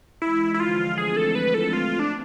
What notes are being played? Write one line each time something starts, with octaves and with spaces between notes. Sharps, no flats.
E3 G#3 E4
E4
D3 F3 F4
A3 C4 G#4
A4
B4
A4
A3 C4 F4
D4